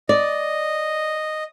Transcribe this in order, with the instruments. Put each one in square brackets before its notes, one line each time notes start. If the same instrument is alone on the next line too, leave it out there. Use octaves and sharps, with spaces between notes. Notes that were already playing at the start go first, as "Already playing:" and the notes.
[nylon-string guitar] D5 [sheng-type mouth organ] D#5